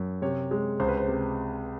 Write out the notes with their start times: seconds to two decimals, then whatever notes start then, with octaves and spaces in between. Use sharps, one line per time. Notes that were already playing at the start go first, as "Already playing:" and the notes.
Already playing: F#2
0.22 C3 C#5
0.51 G#3
0.80 C#2 C5
0.88 B4
0.97 C5
1.08 C3